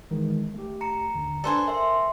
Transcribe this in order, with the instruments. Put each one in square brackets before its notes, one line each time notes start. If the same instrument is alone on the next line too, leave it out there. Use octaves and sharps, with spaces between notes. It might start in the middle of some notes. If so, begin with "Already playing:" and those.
[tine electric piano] D#3 E3 G#3
A3 G4
[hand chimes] A#5 C#7
[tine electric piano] D#2 D3
[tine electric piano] D4 B4 D5 [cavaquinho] A4 C5 G#5
[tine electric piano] A#4 [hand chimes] E5 C6